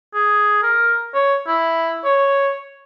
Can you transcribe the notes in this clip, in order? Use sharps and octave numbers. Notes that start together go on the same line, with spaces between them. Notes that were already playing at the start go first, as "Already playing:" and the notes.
G#4
A#4
C#5
E4
C#5